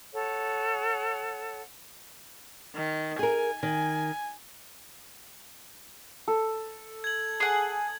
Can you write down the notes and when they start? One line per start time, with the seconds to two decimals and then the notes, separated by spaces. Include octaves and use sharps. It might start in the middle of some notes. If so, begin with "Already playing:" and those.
0.14 A4 C#5 F#5
2.76 D#3
3.19 G#4 A#4 G#5
3.63 D#3 G#5
6.28 A4
7.04 G#6 F#7
7.40 G#4 F#5